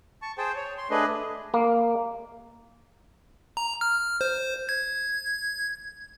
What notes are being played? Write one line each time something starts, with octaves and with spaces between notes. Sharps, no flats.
A5 C#6
G#4 C5 G5 A5
C#5
C6
A3 D4 G#4 B4 D#5
A#3
A#5
F6
C5
G#6